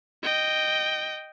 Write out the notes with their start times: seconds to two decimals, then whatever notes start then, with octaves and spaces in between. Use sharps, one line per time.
0.23 D#5 G5